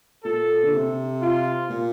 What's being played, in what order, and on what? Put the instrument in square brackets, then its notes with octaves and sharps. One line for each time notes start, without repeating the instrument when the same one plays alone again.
[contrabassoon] A#2 [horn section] A4
[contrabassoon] D3
C3
[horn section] F4
[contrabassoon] A#2